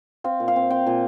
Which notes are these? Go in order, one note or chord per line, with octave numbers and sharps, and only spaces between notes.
C4 F5
A#2
F5
C4
C4 G5
A#2